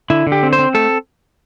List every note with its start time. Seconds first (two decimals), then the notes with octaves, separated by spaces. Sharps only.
0.10 D3 E4
0.27 D3
0.32 G4
0.43 C4
0.53 C5
0.59 C4
0.74 A3 A4